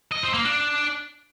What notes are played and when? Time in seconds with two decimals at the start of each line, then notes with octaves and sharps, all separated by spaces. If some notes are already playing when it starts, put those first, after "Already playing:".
0.12 D#5
0.23 C4
0.34 A#3
0.45 D4